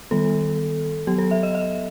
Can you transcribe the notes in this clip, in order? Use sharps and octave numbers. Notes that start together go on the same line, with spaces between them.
D#3 G3 B3 A4
F#3 B3 G4
A4
E5
D#5
E5